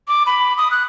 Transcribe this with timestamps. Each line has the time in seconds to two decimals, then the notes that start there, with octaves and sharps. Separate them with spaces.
0.08 D6
0.26 B5
0.58 D#6
0.71 F#6